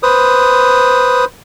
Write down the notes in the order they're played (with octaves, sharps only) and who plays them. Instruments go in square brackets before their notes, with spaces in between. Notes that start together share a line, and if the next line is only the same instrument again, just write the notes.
[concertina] B4 C5 D#6